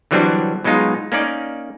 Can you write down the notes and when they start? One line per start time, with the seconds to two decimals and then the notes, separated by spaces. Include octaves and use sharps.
0.11 D3 E3 F#3 G3 C4 D4
0.64 B2 F#3 G#3 D#4 F4
1.12 A#3 C#4 D#4 D5